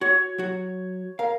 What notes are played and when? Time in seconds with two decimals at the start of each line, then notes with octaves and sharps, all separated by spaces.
0.01 F#4 C#5
0.38 F#3 F#4
1.19 A#4 F5